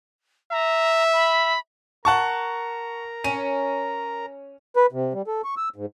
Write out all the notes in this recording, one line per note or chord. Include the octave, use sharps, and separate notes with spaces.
E5 A#5
B5
A#4 F#5 A5 A#5 C#6
C#4 D#7
B4
C3
G3
A4
C#6
E6
G#2